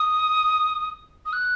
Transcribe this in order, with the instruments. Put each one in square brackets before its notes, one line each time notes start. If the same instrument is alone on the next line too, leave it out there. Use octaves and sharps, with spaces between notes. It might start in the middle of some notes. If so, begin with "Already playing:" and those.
Already playing: [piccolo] D#6
D#6
F#6